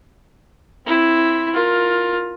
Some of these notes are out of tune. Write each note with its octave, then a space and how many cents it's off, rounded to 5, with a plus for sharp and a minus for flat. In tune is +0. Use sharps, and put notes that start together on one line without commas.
C4 +5 E4 +0
F4 +15 A#4 +10